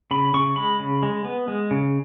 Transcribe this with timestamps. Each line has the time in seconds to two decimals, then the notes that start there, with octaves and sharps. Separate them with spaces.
0.11 C#3 B5
0.34 C#3 C#6
0.56 G#3 B5
0.80 C#3
1.03 G#3
1.25 B3
1.48 G#3
1.71 C#3